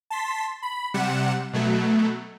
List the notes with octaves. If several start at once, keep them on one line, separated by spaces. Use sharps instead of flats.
A5 C6 B6
B5
C3 G3 F#5 C#7 E7
B2 F#3 A3